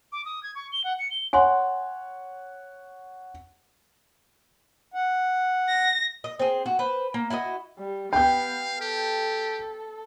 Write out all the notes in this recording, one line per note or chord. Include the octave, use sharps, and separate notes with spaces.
D6
D#6
G#6
C#6
G7
F#5
C#7
G7
C#5 F#5 G#5 C6
F#5
A#6
D#5
C4 G#4
F#4
B4 C5
A#3
E4 F#4 B4 D#5
G3
B3 F5 G5 G6
G4 A4